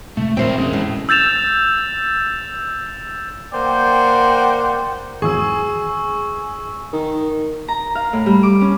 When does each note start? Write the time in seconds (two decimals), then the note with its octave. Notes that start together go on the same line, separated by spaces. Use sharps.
0.17 F1 C3 G#3 A3
0.37 D#2 A#2 F3 C4 A#4 C5 E5 G5
0.57 F1 E2 C3 G#3 C#4
0.73 A2
1.09 E6 G6 A6 E7 F7
3.53 A#3 C5 D5 F#5 G5
5.22 G#1 E2 F#3 G#4 G#5 C#6 E6
6.93 D#3
7.68 A#5
7.95 F5
8.13 A2
8.26 G3
8.43 D6
8.61 C#4